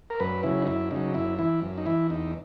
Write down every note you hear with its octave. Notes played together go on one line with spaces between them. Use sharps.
A#4
F#2 B4
C#3 F#3 E4
D#4
F#2 E4
C#3 D#4
F#3
F#2 E4
E3 E4
F#2
D#4
E3 E4
E2 D#4